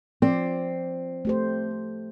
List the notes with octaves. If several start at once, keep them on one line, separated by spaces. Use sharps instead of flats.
F3 C4 D5
A3 G4 C5